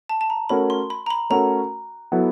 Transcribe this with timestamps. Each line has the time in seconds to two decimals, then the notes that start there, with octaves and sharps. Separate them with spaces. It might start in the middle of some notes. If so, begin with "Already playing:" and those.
0.09 A5
0.21 A5
0.30 A#5
0.49 A3 C#4 F#4 A#4 B5
0.70 C6
0.90 B5
1.06 A#5
1.11 B5
1.30 A3 C#4 F#4 A#4 A#5
2.12 F#3 B3 E4 A4